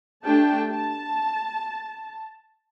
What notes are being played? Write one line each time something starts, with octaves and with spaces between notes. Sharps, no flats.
A3 D4 G4 G5 A5
A5